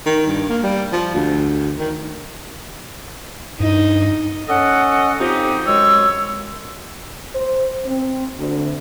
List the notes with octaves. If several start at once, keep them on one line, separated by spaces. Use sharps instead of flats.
D#3
G2
A#3
G3
F3
D2
D#3
G2 D#4
C#4 A4 D#5 F#5
F3 C4 D#4 G4
F#2 G#3 C#5 E6
C5
C4
D2